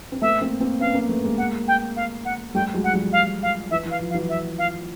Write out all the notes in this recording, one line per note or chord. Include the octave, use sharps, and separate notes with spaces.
C4
A3 B3 E5
A#3 C4
A#3 C4
B3 C#4 F5
A#3 C4
A3 B3
G#3 A#3
F#5
G5
F5
F#5
G3 A3 G5
F#3 G#3
F#5
F3 G3
F5
F5
E3 E5
E3
F5
F3
F5
E3 F#3
E5
F5